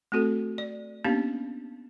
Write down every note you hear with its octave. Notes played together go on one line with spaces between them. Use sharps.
A3 C4 F#4 A4
D5
A#3 B3 C#4 D4 G4 F5